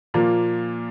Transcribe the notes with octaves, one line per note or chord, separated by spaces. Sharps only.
A#2 F3 A#3